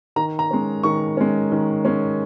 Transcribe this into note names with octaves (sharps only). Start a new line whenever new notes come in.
D#3 A#5
A#5
G#3 C#4
D#3 C#6
G#3 C#4
D#3
G#3 C#4